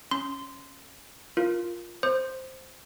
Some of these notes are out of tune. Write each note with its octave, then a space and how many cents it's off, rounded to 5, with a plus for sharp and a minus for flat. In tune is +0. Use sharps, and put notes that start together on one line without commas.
C#4 +0 C6 -15
F4 +0 A#4 +10
C5 +0 D#6 -45